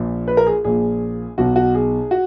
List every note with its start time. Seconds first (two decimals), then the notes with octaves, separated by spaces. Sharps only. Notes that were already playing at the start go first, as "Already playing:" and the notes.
Already playing: A#1 A#2
0.28 B4
0.37 A#4
0.47 G#4
0.64 A#1 A#2 G#4
1.38 B1 B2 F#4
1.56 F#4
1.75 G#4
2.11 F#4